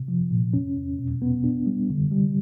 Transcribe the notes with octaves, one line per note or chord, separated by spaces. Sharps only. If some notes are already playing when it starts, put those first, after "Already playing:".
Already playing: C3
F3
A#2
C#4
E2
B2
B3
D4
G3
D3
G3